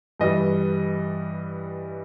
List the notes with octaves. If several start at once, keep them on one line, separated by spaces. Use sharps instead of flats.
G2 E3 G3 D#5